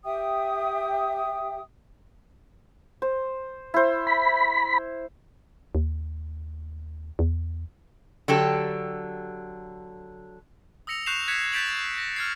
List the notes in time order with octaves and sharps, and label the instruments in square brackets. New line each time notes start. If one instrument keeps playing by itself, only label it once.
[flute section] G4 E5 G5 D#6
[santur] C5
E4 C5
[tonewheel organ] B5
[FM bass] D#2
E2
[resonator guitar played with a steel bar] D3 F#3 G4 A4
[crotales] D#6 E6 A#6 C#7 F7
C#6 F#6 G6 C7 E7 F7
F#6 G#6 B6 C#7 E7 F7
G6 A6 B6 D7 F7 F#7
A#6
F6 G#6 C7